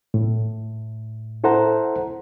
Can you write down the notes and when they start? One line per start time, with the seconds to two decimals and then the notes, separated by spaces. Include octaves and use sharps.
0.14 A2
1.44 E4 A4 C5 F#5 A#5